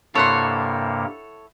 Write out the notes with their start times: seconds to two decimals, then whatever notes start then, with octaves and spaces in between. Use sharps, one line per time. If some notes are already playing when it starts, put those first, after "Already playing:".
0.15 G2 C3 A#3 E4 A4 C#5 F#5 C6